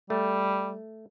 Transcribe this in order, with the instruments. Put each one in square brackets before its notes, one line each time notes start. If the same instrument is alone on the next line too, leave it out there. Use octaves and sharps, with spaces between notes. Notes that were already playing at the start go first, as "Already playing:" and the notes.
[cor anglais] G3 [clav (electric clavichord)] A3